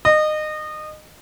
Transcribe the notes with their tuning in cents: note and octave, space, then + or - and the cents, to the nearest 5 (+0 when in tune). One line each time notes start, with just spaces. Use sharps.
D#5 -25